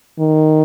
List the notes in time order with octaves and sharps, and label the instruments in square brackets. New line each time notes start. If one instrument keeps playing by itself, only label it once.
[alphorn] D#3